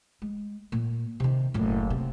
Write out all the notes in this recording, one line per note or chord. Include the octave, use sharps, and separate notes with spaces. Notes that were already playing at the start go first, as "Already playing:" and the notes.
G#3
A#2
C3 D#3
F#1 A2
C3